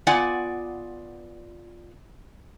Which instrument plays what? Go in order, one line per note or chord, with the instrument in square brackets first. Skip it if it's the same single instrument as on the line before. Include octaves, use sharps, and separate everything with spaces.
[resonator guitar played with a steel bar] B3 F4 D5 F#5 G#5